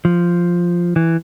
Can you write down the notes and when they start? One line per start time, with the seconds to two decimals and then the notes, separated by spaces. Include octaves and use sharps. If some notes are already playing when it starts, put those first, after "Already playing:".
0.05 F3
0.96 E3